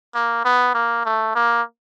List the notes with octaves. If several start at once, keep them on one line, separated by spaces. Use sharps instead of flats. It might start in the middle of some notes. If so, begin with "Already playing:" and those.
A#3
B3
A#3
A3
A#3